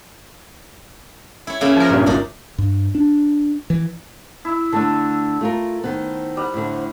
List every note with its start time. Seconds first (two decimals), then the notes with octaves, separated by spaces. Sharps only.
1.47 E4 C#5
1.61 C#3 A#3 E4
1.76 F3 A#4
1.90 G2 A#2
2.06 G#1 F#2 D4 D#4
2.58 G2
2.95 D4
3.70 E3
4.45 E4 E6
4.72 D3 A3 D4 A4
5.41 A3 F4 A#4
5.84 D#3 B3 C5
6.37 G3 F#5
6.54 A2 D3